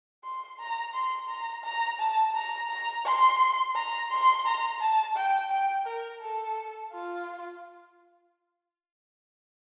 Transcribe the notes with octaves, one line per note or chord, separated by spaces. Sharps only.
C6
A#5
C6
A#5
A#5
A5
A#5
A#5
C6
A#5
C6
A#5
A5
G5
G5
A#4
A4
F4